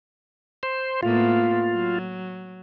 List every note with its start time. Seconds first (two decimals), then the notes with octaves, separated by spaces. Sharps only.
0.63 C5
1.03 A2 A#3 B3 F4
1.73 F#3